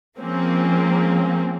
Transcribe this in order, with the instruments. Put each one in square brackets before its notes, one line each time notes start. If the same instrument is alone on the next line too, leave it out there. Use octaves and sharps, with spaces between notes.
[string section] F3 G#3 A#3 C4 C#4